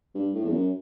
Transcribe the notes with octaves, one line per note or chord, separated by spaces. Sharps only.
G2
A2
E2
F#2